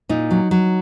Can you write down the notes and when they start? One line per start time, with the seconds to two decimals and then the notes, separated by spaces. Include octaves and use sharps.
0.09 A#2 D#4
0.31 F#3
0.51 F#3